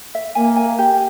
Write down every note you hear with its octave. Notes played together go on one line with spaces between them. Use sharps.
E5
A#3 G#5
G#5
G4